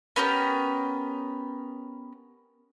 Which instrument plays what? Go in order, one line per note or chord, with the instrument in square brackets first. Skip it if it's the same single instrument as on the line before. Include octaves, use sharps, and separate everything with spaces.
[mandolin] B3 C#4 G4 A#4